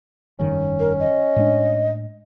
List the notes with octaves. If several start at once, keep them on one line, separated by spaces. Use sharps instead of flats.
F1 G2 D#3 C#4
A#4
D#5
A2 G#3 D4